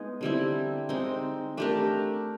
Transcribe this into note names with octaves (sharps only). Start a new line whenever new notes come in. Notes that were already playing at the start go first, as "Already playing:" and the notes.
Already playing: G#3 B3 D#4 G#4
D3 G3 C4 E4
G#3 C4 D#4
A3 D4 G4 A#4